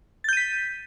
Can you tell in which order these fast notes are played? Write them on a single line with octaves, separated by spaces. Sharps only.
A6 G6 D#7 B6